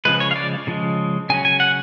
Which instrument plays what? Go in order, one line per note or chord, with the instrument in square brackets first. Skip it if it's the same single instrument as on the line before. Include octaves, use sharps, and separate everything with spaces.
[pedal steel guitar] C#3 F3 G#3 B4
C#5
F5
D5
C#3 F3 G#3
C#3 F#3 C#4 G#5
G#5
F#5